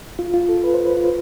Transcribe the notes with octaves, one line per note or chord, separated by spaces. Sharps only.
F4
F4
A4
B4
C5
B4
F4